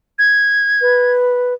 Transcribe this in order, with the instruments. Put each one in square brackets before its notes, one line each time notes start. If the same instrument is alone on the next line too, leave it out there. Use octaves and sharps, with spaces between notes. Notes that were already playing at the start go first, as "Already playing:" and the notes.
[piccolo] G#6
[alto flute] B4